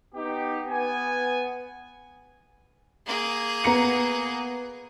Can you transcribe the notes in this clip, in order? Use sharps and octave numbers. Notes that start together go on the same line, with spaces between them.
B3 D#4 G4
B3 G#5
A#3 G#4
B3 A#5 C#7